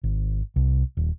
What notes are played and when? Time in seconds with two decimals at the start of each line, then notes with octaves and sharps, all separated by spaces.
0.04 G#1
0.56 C2
0.97 D#1